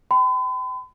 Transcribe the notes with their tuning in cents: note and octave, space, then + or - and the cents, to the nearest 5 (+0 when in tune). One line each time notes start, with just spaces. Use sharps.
G5 -20 B5 +45